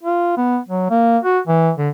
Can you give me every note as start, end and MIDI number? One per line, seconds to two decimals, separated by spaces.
0.03 0.36 65
0.37 0.59 59
0.69 0.86 54
0.90 1.18 58
1.23 1.39 66
1.48 1.71 52
1.78 1.89 50